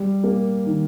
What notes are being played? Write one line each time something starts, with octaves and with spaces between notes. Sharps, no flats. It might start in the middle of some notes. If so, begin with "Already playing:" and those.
Already playing: G3
A#3
D#3